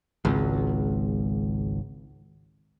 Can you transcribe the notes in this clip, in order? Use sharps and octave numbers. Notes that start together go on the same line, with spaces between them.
G#1 C#2